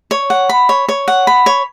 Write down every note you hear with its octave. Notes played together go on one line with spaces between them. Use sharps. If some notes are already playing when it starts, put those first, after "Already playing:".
C#5
F#5
B5
C#5
C#5
F#5
B5
C#5